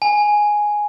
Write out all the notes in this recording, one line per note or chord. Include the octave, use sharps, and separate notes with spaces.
G#5